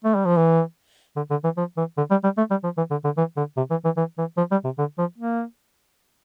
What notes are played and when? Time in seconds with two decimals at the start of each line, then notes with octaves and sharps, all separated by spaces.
0.04 A3
0.15 G3
0.25 F3
0.37 E3
1.16 D3
1.30 D3
1.44 E3
1.57 F3
1.77 E3
1.97 D3
2.11 G3
2.24 G3
2.38 A3
2.50 G3
2.64 F3
2.77 E3
2.91 D3
3.05 D3
3.17 E3
3.37 D3
3.57 C3
3.70 E3
3.85 E3
3.97 E3
4.18 E3
4.37 F3
4.51 G3
4.64 C3
4.78 D3
4.98 F3
5.18 A#3